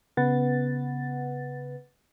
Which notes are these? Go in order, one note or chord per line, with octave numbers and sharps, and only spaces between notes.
C#3 B3 B4 F#5 A6